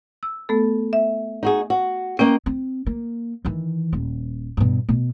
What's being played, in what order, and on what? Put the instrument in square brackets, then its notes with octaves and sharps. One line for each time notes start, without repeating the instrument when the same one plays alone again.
[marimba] E6
A3 B3 A4
E5
[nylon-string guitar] D#4 F#4 G#4
F#4
[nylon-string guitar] A#3 D#5 G5 [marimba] C#4
[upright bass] C4
A#3
D#3 E3
D#1
G2 B2
B2